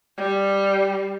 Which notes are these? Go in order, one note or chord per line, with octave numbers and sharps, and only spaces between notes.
G3